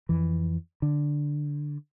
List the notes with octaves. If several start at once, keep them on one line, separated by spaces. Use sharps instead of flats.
F2 E3
D3